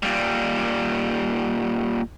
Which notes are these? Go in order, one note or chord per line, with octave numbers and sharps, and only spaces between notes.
A#2 G3